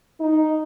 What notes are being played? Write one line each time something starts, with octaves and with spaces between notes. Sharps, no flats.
D#4